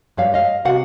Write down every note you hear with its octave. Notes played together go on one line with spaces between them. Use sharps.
G2 G#3 C#5 F5
D#5 F5
C3 F#4 F5 F#5